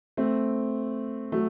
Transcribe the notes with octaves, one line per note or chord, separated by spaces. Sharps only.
A3 C4
F#3 A3